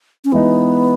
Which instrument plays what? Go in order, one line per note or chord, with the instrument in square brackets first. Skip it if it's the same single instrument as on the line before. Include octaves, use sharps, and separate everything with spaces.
[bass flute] C#4
[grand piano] E3 G#3 D#4 [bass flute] B3